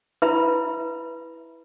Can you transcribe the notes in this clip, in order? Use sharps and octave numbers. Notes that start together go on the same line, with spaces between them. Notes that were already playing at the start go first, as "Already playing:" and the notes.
E4 B4 E5 B5